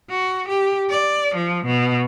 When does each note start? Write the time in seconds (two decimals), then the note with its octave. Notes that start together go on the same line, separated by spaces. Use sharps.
0.10 F#4
0.48 G4
0.90 D5
1.35 F3
1.65 B2